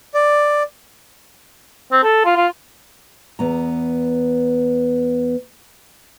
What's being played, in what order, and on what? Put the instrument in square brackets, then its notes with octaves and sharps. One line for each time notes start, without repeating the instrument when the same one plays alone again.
[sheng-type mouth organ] D5
[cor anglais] C4
A4
F4
F4
[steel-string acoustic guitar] E2 B3 A#5